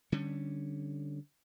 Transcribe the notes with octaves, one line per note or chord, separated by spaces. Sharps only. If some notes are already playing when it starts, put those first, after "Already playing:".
D3 G3 C#4